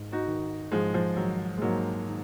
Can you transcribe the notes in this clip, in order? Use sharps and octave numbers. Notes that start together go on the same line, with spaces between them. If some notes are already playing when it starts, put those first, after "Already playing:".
Already playing: G#2
D#4 F#4
D#3
G#2 F3 G#3
F3
D#3 F#3
G#3
G#2 F#3 A#3
D#3